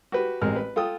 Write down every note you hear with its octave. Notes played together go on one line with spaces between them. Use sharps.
F#4 G4 B4
A1 G#3 C4 A#4 F6
B4
F4 A4 G5 D#6